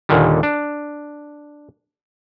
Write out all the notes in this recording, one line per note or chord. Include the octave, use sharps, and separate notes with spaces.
D#2 A#2 D3 D#3 G3
D4